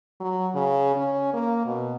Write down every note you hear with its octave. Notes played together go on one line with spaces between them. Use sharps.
F#3
C#3
C#4
A#3
B2